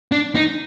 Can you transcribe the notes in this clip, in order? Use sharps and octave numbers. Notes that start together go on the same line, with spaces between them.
D4
D#4